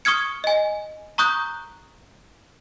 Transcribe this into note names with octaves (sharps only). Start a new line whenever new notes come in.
C#6 D#6 F6 G#6 C#7
D#5 G#5
A#5 C#6 D#6 F#6 G6